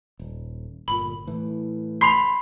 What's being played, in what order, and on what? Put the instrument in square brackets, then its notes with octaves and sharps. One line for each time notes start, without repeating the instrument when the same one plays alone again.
[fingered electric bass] D#1
[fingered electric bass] G1 A#2 [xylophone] B5
[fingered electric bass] A2 E3
[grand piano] B5 C7 [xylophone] C6 F7